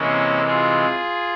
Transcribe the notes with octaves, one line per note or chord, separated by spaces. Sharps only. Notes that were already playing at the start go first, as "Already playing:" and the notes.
Already playing: C3 E3 G#3 A#3 C#4
F4 G#4